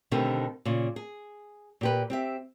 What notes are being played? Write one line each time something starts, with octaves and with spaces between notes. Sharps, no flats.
B2 D3 D#3 A3 C4 G4
A#2 C#3
G#4
A#2 G4 B4
C4 G4 E5